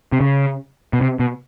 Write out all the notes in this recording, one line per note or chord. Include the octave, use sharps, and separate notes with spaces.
C3
C#3
B2
C3
B2